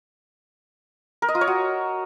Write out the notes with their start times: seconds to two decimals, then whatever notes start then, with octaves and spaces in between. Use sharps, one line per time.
1.22 A#4
1.28 D#5
1.35 F4
1.41 C#5
1.47 F#4